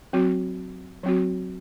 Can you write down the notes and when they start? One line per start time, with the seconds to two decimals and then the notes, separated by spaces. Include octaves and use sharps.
0.13 F#3 C4 F#4
1.03 F#3 C4 F#4